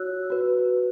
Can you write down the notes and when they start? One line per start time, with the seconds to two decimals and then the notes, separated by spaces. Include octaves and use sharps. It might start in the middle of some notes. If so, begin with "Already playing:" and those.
Already playing: F#4 C#5 E6 F#6
0.30 F#4 B4